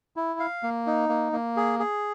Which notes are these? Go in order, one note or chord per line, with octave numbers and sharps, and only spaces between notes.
E4
F5
A#3
D#4
A#3
A#3
G#4
G#4